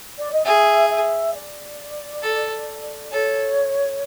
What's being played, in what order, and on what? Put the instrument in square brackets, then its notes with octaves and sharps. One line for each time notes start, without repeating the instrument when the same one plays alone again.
[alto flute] D5
D#5
[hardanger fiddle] G#4 [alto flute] E5
[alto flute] E5
D5
[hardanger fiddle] A4
[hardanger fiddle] A4 [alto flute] C#5